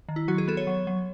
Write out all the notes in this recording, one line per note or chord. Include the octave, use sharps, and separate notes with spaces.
D#3
E4
F#3 F#4
G#4
B3 A4
C#5
F#3
F#3